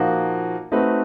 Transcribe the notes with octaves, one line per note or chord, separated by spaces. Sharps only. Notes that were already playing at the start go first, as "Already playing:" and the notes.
Already playing: A#2 F3 A#3 D#4 F#4
A3 C4 D#4 F#4 B4